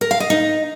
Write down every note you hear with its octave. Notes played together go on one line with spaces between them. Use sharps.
A#4
F5
D#5
D#4